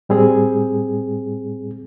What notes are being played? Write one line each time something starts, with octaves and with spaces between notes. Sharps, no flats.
A2 G3 C4 G#4